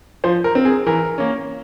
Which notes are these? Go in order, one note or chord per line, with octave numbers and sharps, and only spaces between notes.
F3 C5
A#4
C4
G#4
E3 A#4
A#3 C#4